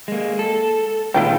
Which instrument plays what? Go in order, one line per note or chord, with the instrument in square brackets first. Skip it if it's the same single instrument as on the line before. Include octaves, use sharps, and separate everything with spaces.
[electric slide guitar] G#3 A#3
A4
[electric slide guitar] A#2 D#3 G#3 [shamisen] E4 F4 G5